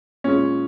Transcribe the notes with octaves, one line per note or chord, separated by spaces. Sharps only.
A#2 G#3 C#4